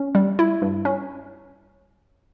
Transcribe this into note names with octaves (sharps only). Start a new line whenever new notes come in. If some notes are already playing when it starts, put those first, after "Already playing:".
Already playing: C#4
G3
E4
G2
C#4